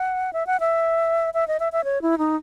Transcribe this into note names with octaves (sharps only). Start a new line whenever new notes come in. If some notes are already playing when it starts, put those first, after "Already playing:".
Already playing: F#5
E5
F#5
E5
E5
D#5
E5
E5
C#5
E4
D#4